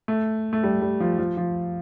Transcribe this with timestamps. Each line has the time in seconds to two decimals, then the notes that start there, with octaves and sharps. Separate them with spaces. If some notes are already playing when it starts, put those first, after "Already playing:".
0.08 A3
0.53 A3
0.63 G3
0.81 G3
1.00 F3
1.18 F3
1.37 F3